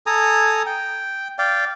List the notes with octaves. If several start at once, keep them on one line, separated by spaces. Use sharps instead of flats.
A4 G#5 A#5 D#6
G5
D5 F5 G5